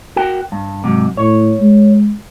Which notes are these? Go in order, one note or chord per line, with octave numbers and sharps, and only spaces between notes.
F#4 A#4 G5
G2
G#2 C3 F#3
A2 C#5
G#3